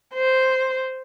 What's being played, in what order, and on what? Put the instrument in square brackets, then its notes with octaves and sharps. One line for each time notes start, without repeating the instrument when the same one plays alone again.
[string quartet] C5